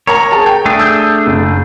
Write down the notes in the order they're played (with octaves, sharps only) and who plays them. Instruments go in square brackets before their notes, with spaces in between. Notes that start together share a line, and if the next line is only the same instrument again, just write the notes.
[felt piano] A#4 A#5 [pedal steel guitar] C#5
[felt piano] G#4 A5
G5
[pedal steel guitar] A3 D4 G#4
[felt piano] E6 G6
F#1